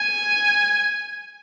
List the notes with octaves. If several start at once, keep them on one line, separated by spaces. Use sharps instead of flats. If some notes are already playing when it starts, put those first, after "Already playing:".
Already playing: G#5